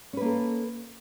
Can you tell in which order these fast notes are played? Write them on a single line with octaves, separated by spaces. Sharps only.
C#4 B4 A#3 A4